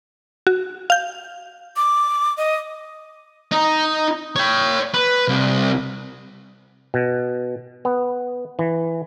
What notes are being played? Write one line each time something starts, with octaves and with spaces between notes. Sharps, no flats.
F#4
F5 G6
D6
D#5
D#4
C#5 G5
B4
C2
B2
B3
E3